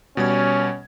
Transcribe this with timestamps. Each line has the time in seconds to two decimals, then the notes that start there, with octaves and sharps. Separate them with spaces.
0.17 B2 G3 C#4 G#6